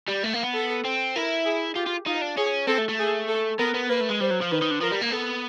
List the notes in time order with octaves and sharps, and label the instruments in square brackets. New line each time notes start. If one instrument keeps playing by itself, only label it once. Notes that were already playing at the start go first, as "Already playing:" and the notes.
[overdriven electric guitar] G3
A3
A#3
B3
[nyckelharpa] A4
[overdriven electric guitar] C4
[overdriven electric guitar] E4 [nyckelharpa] A#4
[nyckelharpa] G#4
[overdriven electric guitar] F4 [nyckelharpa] G4
[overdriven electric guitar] F4
[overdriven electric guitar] D#4 [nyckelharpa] F4
[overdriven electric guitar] D4
[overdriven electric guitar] C#4 [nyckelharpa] G#4
[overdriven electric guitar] C4 [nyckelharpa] A4
[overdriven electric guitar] A3
A3
[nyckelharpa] G#4
A4
[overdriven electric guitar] B3 [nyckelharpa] A#4
[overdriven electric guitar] B3
[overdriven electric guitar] A#3 [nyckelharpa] B4
[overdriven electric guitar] A3
G#3
[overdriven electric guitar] G3 [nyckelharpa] C5
[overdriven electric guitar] F#3
F3
[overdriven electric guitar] D#3 [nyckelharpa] B4
[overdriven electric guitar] D#3
D3
[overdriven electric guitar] F3 [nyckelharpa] A#4
[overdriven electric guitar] G3
A#3
[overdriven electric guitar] B3 [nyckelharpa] A4